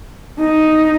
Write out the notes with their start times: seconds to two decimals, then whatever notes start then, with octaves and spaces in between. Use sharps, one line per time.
0.39 D#4